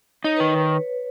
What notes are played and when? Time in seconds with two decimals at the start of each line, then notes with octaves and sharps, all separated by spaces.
0.24 D#4 C#5
0.37 D#3 B4